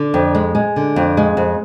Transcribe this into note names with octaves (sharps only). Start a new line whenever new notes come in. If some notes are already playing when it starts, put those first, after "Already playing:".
Already playing: D3
F2
G#3
G#3
D3
F2
G#3
F2